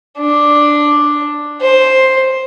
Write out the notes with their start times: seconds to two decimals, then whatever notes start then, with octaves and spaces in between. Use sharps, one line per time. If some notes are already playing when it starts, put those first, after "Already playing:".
0.19 D4
1.61 C5